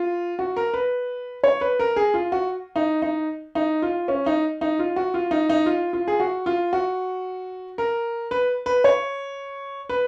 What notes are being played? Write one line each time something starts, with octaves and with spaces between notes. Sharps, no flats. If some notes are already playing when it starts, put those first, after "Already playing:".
Already playing: F4
F#4
A#4
B4
C#5
B4
A#4
G#4
F4
F#4
D#4
D#4
D#4
F4
C#4
D#4
D#4
F4
F#4
F4
D#4
D#4
F4
F4
G#4
F#4
F4
F#4
A#4
B4
B4
C#5
B4